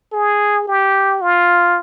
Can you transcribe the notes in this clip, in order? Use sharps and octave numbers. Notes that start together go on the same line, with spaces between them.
G#4
G4
F4